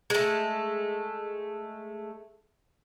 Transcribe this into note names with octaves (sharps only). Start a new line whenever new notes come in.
G#3 A3